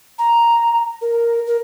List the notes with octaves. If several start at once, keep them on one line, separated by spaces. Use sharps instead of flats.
A#5
A#4
A#4